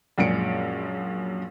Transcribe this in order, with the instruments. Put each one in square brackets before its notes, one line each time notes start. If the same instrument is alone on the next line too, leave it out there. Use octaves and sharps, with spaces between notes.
[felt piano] A#1 F#2 G#3 G#4 C#7 D7